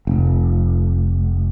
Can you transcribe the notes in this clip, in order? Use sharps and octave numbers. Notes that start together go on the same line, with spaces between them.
F1